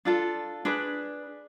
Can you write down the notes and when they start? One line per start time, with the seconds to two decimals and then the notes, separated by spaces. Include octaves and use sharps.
0.05 D4 F4 A4
0.65 D4 G#4 B4